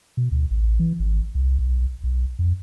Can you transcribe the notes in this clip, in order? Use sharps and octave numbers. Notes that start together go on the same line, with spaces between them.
B2
D2
A1
E3
G#1
C2
B1
B1
F2